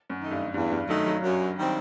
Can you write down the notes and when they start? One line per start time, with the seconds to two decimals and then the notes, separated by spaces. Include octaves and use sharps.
0.10 F#2
0.20 D#3 A3 D#4
0.31 G2
0.54 E2 G2
0.72 G2
0.89 D#3 F#3 A3 D#4
1.07 F#3
1.23 F#2
1.58 D#3 G3 C4